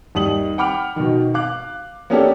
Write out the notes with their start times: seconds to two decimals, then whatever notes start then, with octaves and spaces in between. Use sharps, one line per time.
0.15 D#2 G3 D#6 F#7
0.58 F#5 G5 B5 D6 F6 F7
0.96 B2 D#3
1.34 F5 D6 F#6
2.10 A#3 B3 C#4 D4 G4 A4